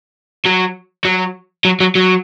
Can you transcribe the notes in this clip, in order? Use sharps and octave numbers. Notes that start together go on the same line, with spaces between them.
F#3
F#3
F#3
F#3
F#3